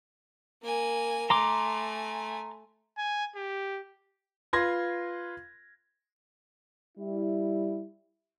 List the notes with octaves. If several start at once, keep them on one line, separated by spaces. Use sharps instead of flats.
A#3 G#5
A3 G#5 A#5 C6 D6
G#5
G4
F4 B4 C6 G#6 A#6
G3 E4